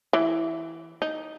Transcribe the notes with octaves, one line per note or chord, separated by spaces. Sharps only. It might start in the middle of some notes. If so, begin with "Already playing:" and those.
E3
D#4